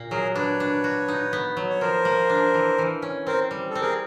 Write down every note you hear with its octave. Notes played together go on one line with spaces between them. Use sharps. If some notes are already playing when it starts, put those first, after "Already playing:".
Already playing: A#2 A#3
F#3 G#4 A#4
D4 B4 C#5
D4
F#4
D#4
B3
F#3
C#5
F3 A#4 C5
A#3
D4
E3
E3
C#4
C4 A#4 C5
G3
A4
C4
G#4 A#4